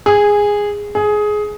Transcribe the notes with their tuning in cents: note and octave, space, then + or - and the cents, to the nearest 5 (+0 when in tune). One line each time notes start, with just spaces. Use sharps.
G#4 -10
G#4 +15